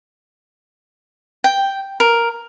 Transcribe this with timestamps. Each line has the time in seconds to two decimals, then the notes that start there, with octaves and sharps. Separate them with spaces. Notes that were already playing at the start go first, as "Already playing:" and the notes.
1.44 G5
2.00 A#4